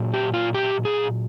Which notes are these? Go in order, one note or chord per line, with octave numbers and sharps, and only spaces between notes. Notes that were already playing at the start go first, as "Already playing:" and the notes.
Already playing: A#2 F#3
G4
F4
G4
G#4